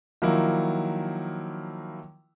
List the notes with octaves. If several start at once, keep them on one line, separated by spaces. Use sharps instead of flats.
D#3 F3 F#3 A#3 E4